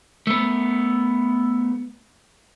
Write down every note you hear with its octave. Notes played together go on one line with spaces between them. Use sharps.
A3 B3